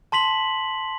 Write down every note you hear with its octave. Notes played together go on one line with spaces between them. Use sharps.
A5 C6 B6 F#7